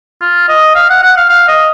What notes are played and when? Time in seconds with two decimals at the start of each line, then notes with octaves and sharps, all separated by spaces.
0.21 F4
0.49 D#5
0.75 F5
0.90 F#5
1.03 F#5
1.17 F5
1.30 F5
1.48 D#5